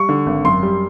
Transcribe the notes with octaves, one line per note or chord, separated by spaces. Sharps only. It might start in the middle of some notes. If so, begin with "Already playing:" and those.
Already playing: G3 C#6
D3
G#1
F#2 C6
G3